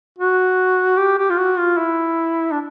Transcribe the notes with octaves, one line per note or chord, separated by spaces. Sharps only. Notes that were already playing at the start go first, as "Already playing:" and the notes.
F#4
G4
G4
F4
F#4
F4
E4
D4